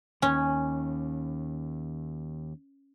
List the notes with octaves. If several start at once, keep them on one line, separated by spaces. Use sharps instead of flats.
D#2 C#4